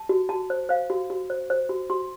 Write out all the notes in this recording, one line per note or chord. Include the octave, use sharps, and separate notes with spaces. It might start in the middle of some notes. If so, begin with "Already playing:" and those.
Already playing: A5
F#4
F#4 A5
C5
C5 F5
F#4
F#4
C5
C5
F#4
F#4 C6